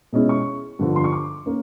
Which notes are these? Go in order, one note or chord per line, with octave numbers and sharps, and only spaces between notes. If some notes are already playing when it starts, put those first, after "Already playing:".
B2 G#3 C#4 E4
C#6
G2 D3 F3
C6
C#6
D6
A#3 C#4